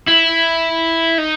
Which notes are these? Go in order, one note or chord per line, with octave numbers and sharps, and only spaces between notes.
E4
D#4